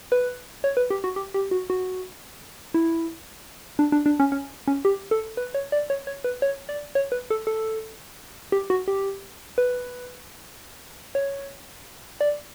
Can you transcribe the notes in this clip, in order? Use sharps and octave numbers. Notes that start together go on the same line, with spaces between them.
B4
C#5
B4
G4
F#4
G4
G4
F#4
F#4
E4
D4
D4
D4
C#4
C#4
C#4
G4
A4
B4
C#5
D5
C#5
C#5
B4
C#5
D5
C#5
B4
A4
A4
G4
F#4
G4
B4
C#5
D5